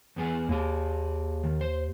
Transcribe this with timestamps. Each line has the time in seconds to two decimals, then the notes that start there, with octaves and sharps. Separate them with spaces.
0.16 E2 B3 G#4
0.49 D#2 A#3 G#4
1.43 D#3
1.61 C5